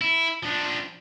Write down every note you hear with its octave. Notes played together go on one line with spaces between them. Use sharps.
E4
F3 D4